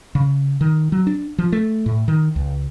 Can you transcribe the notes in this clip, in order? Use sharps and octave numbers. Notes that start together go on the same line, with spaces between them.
C#3
D#3
F#3
D4
F3
A3
A2
D#3
C#2